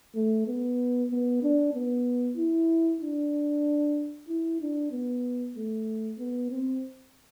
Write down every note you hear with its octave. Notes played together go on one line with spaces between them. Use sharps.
A3
B3
B3
D4
B3
E4
D4
E4
D4
B3
A3
B3
C4